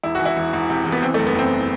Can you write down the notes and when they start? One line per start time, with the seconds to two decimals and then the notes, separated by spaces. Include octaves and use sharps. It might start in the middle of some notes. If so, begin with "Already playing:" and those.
0.03 E1 E4
0.15 E3 F#4
0.25 E4
0.37 E1
0.53 E1
0.70 C3
0.85 E2
0.92 B3
1.02 E3 C4
1.14 A3
1.19 F#1
1.27 B3
1.35 F#1 C4